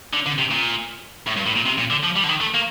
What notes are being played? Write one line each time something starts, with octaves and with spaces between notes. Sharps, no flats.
D3
D3
C3
A#2
A2
G2
A2
A#2
C3
A#2
D3
F3
G3
D3
D#3
A3
A#3